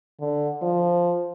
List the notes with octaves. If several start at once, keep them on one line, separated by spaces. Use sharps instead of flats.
D3
F3